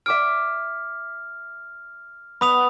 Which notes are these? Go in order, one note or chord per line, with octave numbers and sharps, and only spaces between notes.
E5 D6 F6 D7
B3 B5 D#6 F7